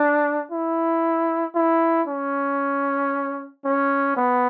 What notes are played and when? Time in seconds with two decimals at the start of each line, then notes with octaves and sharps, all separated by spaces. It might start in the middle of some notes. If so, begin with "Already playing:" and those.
Already playing: D4
0.52 E4
1.55 E4
2.08 C#4
3.65 C#4
4.17 B3